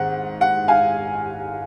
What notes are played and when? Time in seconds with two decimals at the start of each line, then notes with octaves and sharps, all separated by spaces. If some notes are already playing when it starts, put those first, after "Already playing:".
Already playing: G#2 D#3 C4 F#5
0.41 F#5
0.68 F5 G#5